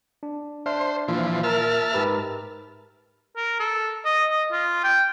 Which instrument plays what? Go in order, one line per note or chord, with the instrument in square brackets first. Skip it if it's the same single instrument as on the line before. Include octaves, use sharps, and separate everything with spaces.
[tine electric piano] D4
[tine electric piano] D4 E5 F6 [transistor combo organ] C5
[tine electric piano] A#2 [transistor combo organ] E3 F3
[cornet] A#4 [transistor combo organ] E5 A5 F6
[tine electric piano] G#2 G4 A#4 [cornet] B4
[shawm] A#4
A4
D#5
D#5
F4
G5